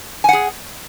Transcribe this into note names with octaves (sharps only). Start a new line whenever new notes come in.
G#4 F#5 G#5